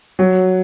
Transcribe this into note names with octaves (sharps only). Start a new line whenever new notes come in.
F#3